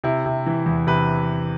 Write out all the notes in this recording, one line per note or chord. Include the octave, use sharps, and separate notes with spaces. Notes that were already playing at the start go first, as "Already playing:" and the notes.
C3 E4
C3
E3
E2
C3 B4